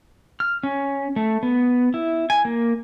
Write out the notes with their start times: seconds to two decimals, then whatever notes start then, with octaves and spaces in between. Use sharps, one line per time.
0.40 F6
0.63 C#4
1.16 A3
1.43 B3
1.94 E4
2.30 G#5
2.45 A#3